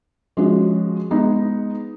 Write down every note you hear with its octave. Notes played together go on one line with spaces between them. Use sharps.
F3 G#3 C#4 F#4
G#3 B3 D#4